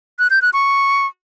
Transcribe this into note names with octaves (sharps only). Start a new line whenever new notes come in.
F#6
G6
F#6
C#6